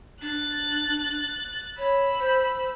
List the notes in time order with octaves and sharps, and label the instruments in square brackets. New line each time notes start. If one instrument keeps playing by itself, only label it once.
[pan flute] D4 [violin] F#6 A6
[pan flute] C#5 [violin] B5 E6
[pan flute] C5